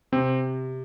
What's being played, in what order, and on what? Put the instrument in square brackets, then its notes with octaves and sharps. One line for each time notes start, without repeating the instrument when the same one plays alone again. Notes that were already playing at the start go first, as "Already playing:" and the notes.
[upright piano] C3 [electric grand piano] C4